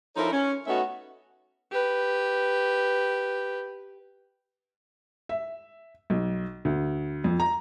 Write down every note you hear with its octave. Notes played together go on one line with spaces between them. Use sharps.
F3 D#4 E4 A4 A#4 C#5
C#4
A3 B3 C#4 D#4 F#4 E5
G4 B4
E5
B1
D2
F2
A#5